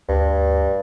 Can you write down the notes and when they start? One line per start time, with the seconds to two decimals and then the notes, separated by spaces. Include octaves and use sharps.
0.09 D2 G2